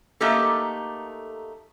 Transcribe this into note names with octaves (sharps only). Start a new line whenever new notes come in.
A3 A#3 D#4 G4 A4